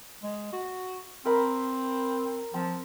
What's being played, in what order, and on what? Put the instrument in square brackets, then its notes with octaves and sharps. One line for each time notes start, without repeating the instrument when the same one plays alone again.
[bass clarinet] G#3
F#4
[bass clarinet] C4 [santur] A#4 B5
[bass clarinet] F3 [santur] C4